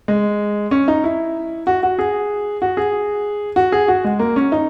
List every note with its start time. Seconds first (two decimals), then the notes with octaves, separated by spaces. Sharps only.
0.08 G#3
0.71 C#4
0.88 D#4
1.04 E4
1.67 F#4
1.83 F#4
1.99 G#4
2.62 F#4
2.77 G#4
3.56 F#4
3.72 G#4
3.88 F#4
4.04 G#3
4.19 A#3
4.36 C#4
4.52 D#4